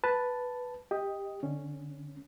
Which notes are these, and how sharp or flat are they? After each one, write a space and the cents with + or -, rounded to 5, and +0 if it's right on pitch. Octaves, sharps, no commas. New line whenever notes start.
B4 +0 A5 +0
G4 +15 D#5 +5
D3 +0 C#4 +0